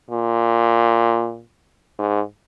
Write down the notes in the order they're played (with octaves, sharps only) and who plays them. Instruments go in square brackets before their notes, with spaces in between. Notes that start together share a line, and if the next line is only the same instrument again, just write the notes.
[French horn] A#2
G#2